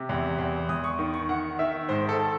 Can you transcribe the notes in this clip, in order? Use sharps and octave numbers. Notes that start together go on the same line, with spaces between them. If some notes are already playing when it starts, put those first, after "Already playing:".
Already playing: C3
E2
E2
E2 D#6
C#6
D#3
C#6
D#3 F#5
D#3 E5
G#2 C5
A4
A4